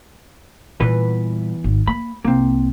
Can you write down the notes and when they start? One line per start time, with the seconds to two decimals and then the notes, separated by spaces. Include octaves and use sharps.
0.80 E2 A#2 E3 G3 B4
1.64 G#1
1.87 A#3 B5
2.24 C2 A#3 C4